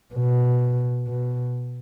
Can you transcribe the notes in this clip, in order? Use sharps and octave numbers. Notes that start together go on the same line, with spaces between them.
B2
B2